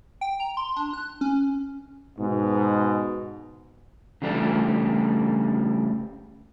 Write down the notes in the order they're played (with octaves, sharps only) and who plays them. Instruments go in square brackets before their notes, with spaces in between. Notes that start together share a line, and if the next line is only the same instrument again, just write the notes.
[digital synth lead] G5
A#5
C6
D4
F#6
C#4
[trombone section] G#2 B2
[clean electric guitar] C#3 E3 G3 A3 D4